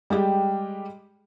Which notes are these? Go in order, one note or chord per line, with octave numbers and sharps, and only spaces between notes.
G3 G#3 G4